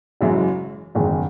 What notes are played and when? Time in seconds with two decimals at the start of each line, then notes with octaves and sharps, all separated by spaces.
0.21 F#1 F#2 E3 G#3
0.95 F#1 E2 D#3 G#3